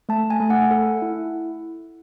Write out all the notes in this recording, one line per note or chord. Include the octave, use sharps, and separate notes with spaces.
A3 A5
G#5
A3
F#5
A4
E4